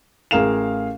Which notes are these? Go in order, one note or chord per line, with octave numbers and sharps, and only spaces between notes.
A1 G#4 A#4 F5 E7 F7